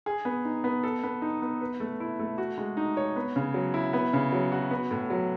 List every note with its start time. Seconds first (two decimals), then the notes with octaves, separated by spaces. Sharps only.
0.06 G#4
0.25 B3
0.45 D#4
0.64 B3
0.84 A4
1.03 B3
1.22 D#4
1.42 B3
1.61 B4
1.80 A3
2.00 E4
2.19 A3
2.38 F#4
2.58 G#3
2.77 D#4
2.97 C#5
3.16 B3
3.36 C#3
3.54 F#3
3.74 E4
3.93 B3
4.13 C#3
4.32 F#3
4.52 F#4
4.71 B3
4.91 A2
5.10 F#3